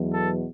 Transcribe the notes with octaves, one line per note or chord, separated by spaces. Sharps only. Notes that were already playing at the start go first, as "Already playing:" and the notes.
Already playing: E2 B2 F#3
A4